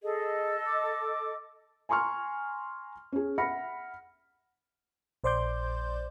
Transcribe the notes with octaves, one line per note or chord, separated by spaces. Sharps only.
G#4 A4 D#5
D6
G#5 A#5 C6 C#6 F6
C#4 G#4
E5 F#5 B5 F6 A#6 C#7
A#1 C5 D5 C6 D6 G6